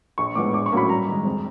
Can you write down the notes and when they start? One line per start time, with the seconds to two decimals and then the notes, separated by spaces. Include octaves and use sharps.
0.18 A#1 C#6
0.35 A2 F3 G#3 B3 D6
0.53 A#1 D6
0.66 C#6
0.72 A2 F#3 A#3 C#4 B5
0.89 G2 A#5
1.07 D#3
1.12 G#3
1.25 F2